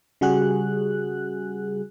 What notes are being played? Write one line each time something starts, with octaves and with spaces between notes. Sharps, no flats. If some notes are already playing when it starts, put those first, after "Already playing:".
C#3 G3 F#4 G#4 F#6